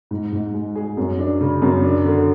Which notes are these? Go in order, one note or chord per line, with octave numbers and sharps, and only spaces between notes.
G#2
G#2
G#3
G#4
F#2
D4
C#3
F#2
D4
D3